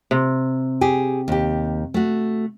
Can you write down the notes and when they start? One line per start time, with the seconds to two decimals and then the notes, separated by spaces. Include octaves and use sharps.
0.11 C3
0.81 G4 G#4
1.28 D#2 G4
1.94 A3 F#4